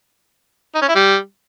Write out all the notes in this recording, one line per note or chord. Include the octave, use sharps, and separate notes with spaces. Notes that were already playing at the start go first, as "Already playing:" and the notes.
D#4
C#4
E4
G3